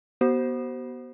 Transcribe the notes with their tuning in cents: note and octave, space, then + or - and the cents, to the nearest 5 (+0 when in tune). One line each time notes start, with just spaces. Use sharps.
B3 -20 F#4 +45 C5 +0